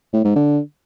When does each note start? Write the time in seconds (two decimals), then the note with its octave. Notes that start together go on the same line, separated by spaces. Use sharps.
0.13 A2
0.24 G#2
0.36 D3